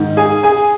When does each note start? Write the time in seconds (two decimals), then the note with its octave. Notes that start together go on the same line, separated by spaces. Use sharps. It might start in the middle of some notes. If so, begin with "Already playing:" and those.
Already playing: G#2 D#3
0.17 G#4 G#5
0.43 G#4 G#5